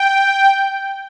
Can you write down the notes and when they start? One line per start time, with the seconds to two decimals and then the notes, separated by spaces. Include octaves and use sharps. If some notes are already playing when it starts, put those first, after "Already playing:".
Already playing: G5